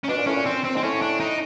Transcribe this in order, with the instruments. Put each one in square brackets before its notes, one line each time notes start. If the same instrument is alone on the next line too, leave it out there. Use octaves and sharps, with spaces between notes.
[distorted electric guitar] C#4
[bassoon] B2 [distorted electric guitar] D4
[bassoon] A#2
[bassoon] A2 [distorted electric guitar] C#4
[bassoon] A#2
[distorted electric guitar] C4
C4
[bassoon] G#2 [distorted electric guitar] C4
[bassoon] A2 [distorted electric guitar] C#4
[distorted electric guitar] D4
D#4